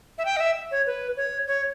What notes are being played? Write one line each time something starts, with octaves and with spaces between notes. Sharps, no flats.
E5
G5
D#5
E5
C#5
B4
C#5
C#5